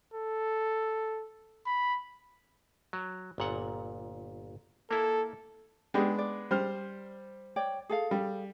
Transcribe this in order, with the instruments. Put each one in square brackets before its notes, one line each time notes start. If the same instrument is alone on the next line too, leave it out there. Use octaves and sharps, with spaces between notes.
[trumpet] A4
B5
[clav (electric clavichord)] F#3
G1 A#2 F#5
[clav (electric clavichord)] A#3 E4 [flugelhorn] A4
[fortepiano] G#3 B3 D4 [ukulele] G4 G#4
[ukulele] D5
[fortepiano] G3 C5 F6
[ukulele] C#5 D5 G5
G#4 A4 F5
[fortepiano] G3